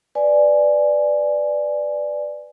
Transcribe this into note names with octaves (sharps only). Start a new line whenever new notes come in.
B4 D5 G#5